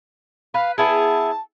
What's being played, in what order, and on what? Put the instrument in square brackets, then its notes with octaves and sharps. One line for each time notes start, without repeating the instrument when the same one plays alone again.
[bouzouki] B4 [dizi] F5
[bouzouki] B3 E4 G#4 [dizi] A5